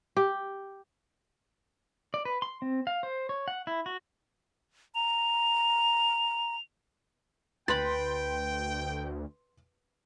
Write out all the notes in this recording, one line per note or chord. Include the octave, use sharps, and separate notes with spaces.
G4
D5
B4
C6
C4
F5
C5
C#5
F#5
E4
F#4
A#5 F7
D2 B4 G5 B5 C6 A6